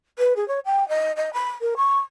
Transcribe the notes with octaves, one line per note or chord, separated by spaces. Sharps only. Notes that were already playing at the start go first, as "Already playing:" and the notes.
B4
G#4
C#5
G5
D#5
D#5
B5
A#4
C#6